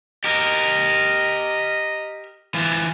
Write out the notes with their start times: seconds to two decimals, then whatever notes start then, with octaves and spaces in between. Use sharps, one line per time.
0.24 G4 A#4 D#5
2.55 E3 F4